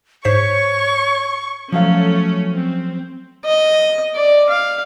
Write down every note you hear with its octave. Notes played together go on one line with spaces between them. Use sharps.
G#2 C5 C#5 C#6 B6
F3 F#3 A3 C#4 F5
C4
D#5
D5
F5